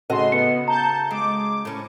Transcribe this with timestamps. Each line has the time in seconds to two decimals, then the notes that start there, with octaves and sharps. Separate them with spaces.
0.10 A2 C#3 F#4 A4 D#5 C6
0.32 B3 C#7
0.68 A5 A#5 G6
1.11 G#3 D6
1.65 A2 C#4